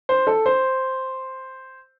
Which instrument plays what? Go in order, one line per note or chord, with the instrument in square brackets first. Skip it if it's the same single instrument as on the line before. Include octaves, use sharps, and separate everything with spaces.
[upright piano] C5
A4
C5